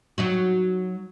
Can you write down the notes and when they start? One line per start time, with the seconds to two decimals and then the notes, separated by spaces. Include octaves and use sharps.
0.18 F#3 D#4 F#4